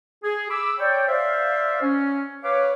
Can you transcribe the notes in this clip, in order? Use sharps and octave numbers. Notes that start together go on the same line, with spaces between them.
G#4
B5 D6 E6
C#5 D5 G5
C5 D5 E5 F5
C#4
B4 C#5 F5 D6